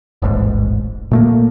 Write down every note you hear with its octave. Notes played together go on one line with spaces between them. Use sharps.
D#1 A1 G#2
A#2 A3 A#3